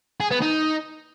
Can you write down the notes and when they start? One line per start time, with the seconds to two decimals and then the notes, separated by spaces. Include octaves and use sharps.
0.20 G#4
0.31 B3
0.42 D#4